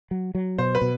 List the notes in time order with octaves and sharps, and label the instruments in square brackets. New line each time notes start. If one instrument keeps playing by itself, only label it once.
[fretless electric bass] F#3
F#3
[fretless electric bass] B2 [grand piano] C5
[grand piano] B4
[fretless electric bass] B2